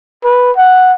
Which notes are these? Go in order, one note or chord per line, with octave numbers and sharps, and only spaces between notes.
B4
F#5